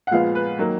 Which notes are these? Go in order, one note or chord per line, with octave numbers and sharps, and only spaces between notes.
F#5
A#2 F3 G#3 B3 F5
B4
D#3 F#3 A#3